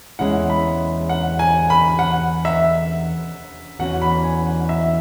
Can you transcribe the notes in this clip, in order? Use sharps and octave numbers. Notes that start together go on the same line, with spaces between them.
E2 E3 G#3 C#4 E4 F#5
B5
F#5
G#5
B5
F#5
E5
E2 E3 C#4 F#4 F#5
B5
G#5
F#5
E5